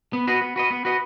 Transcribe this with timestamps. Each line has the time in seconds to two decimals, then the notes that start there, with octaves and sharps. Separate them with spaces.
0.13 B3
0.28 F#4 B4 D#5
0.41 B3
0.56 F#4 B4 D#5
0.71 B3
0.85 F#4 B4 D#5